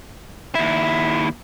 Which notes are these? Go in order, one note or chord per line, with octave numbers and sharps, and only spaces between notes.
D#2 E4